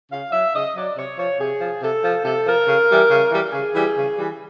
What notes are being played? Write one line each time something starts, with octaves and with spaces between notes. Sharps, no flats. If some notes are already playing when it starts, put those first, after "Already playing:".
C#3 F5
F#3 E5
C#3 D#5
F#3 D5
C3 C#5
F3 C#5
C3 G#4
F3
C3 A4
F3
C3 A4
F3 A#4
C#3
E3 G3
C#3
E3 G3
C#3 G#4
E3 G3
C#3
E3 G3